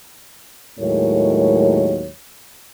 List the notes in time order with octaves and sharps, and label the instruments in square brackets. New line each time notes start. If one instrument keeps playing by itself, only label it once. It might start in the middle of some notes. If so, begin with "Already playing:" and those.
[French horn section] D#2 A2 F#3 G#3 A#4 C#5